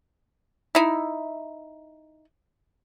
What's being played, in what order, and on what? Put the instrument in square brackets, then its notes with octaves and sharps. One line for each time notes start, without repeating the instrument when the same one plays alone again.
[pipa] D#4 E4